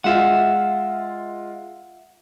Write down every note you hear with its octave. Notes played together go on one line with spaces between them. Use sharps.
G#3 F4 E5 F#5